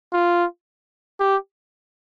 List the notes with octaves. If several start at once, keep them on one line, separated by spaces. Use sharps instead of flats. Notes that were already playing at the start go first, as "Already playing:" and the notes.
F4
G4